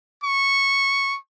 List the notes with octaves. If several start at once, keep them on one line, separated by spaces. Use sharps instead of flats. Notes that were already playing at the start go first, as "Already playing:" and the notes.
C#6